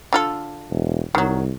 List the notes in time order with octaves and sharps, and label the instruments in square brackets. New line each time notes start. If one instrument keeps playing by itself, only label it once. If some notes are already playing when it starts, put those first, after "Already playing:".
[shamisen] D3 F4 A4
[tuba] E1
[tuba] C2 [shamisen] D#3 F#3